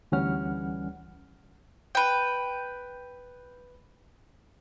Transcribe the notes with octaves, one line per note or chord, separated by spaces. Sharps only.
D2 E3 G3 C#4 F#5 F6
B4 G5